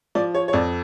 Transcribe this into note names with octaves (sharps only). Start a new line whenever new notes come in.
F3 D5
C#5
C#5
F2 D5